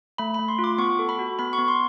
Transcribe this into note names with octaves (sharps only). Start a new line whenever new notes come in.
A3 B5
B5
A3
C6
F4
D6
B3 C#6
A4
B5
F#4
B3 B5
C#6
B3
C6